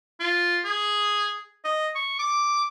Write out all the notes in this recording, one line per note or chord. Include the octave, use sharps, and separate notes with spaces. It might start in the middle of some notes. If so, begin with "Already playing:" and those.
F4
G#4
D#5
C#6
D6